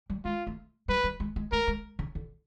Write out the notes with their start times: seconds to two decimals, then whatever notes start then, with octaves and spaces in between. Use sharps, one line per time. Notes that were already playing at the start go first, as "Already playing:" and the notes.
0.10 G3
0.25 G#3 F4
0.47 A3
0.88 G3 B4
1.04 G3
1.20 G#3
1.36 G#3
1.52 A3 A#4
1.67 G#3
1.99 C#3
2.15 D3